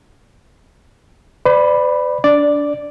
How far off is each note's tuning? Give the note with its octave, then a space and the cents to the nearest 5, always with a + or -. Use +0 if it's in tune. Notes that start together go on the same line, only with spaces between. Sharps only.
B4 +45 D5 +10 B5 +0
D4 -20 D5 +0